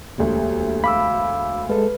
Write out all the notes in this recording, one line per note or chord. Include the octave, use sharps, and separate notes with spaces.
E1 D2 A#3 G4 A4
F5 B5 D6 E6
G#3 A4 B4